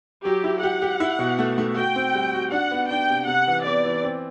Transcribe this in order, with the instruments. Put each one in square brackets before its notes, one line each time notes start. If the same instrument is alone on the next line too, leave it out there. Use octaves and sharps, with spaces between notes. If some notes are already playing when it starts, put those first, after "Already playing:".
[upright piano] F#3 [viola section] G4
[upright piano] E4
[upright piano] G4 [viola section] F#5
[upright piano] G4
E4
B2
A3
A3
[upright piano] F#4 [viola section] G5
[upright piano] C4
G3
F#4
[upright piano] D4 [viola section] F#5
[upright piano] B3
[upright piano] D4 [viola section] G5
[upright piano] C3
[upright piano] C3 [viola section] F#5
[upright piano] E3
[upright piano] B3 [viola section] D5
[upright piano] E3
C4